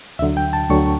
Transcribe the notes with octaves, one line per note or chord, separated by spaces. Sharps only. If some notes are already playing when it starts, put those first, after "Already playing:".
D2 D3 F#3 E5
G5
A5
D2 D3 F#3 C#6